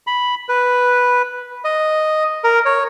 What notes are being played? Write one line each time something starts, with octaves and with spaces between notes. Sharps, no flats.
B5
B4
D#5
A#4
C#5